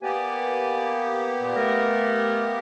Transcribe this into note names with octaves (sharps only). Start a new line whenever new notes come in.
A#3 B3 G4 B4 D5 G#5
A#2
A3 A#4